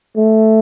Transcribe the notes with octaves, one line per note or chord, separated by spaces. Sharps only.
A3